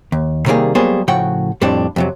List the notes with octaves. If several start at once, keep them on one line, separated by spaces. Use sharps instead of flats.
D#2
C3 D#3 G3 A#3 G#4
F#3 G3 A#3 B3 G#4 C5
A2 C#3 F3 F#4 F#5 G5
F2 A2 G3 C4 D4
F2 C3 F#3